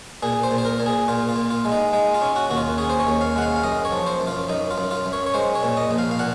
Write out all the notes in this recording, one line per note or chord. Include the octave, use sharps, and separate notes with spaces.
A#2 G#4
C5
A#2
C5
A#4
A#2
G#4
A#2 F4
F4
A#2
F4
G#3
D#4
G#3 D#4
F4
C#4
F#4
D#2 F#4
F4
C#4 G#4
C5
C#5
D#2
F5
G#3 F#5
F5
F5
F#2 D#5
C#5
F3
C5
F#2
F4
F#2 D#4
F4
F#2
F4
F#2
C#5
C#5
G#3 C5
C#5
A#2
D#5
A#1
F5
F5
A#2 F#5